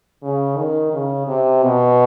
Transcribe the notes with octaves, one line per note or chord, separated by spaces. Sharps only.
C#3
D#3
C#3
C3
B2